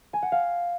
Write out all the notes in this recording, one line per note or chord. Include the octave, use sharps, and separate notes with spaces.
G#5
F#5
F5